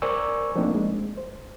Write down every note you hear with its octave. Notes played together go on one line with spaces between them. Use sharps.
A#4 C5 D5 G#5 C#6 E6
F3 A3 A#3 C4 D4 D#4
G#3
C5